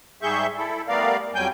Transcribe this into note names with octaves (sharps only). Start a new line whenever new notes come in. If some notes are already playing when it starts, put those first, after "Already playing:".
G#2 G3 G#4 E5 C#6 G6
E4 A4
G3 A3 B3 A#4 D5 F5
F2 F#3 G3 G5 G#5 G6